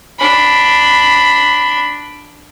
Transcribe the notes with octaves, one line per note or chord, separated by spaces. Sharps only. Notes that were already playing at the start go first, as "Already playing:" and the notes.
D4 B5